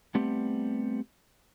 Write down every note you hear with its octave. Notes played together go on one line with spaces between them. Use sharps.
G3 A3 B3 C4 G4